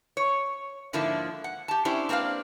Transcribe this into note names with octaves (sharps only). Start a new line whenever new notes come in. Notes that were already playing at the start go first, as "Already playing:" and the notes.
C#5
G#2 D3 F3 A#3 D4 E4
F#5
G4 A5
C#4 D4 E4 G4 C5
A#3 C4 D4 B4 F5